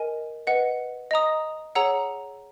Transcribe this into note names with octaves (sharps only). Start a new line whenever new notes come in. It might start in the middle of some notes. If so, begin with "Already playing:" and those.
Already playing: A#4 D#5 G#5
B4 D#5 F#5
D#5 A#5 D#6
G#4 C#5 F#5 A#5 E6